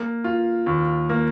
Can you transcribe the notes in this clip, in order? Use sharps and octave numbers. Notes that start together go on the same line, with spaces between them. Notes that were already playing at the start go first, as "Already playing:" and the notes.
Already playing: A#3
F4
D#2
A#3